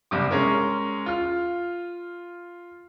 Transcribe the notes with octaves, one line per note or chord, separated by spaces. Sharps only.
F#1 G2 C3 D6
G#3 C#4 A#4
F4 F6